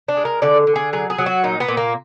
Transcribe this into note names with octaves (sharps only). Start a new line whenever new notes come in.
D4
G#3
A#4
D3 D5
D3
G#4
F#3 G#4
G#4
F#3
F#4
A#2 D#4
B3
A#2
A#3